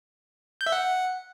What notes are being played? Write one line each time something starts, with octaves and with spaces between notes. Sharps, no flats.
G6
E5
F#5